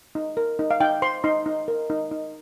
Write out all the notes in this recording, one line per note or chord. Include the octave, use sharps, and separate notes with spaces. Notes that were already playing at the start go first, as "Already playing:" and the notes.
D#4
A#4
D#4
F5
D#4 G5
C5 C6
D#4 C6
D#4
A#4
D#4
D#4